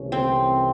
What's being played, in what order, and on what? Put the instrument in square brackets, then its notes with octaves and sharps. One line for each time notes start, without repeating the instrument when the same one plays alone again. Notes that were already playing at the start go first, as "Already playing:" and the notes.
Already playing: [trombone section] C2 C3 E3 A3 C#4
[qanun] C4